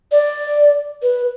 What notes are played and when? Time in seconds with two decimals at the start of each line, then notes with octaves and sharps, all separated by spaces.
0.12 D5
1.02 B4